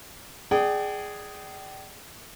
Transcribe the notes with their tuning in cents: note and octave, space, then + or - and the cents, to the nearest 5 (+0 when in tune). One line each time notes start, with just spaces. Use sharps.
G#4 +0 D5 +20 G5 -35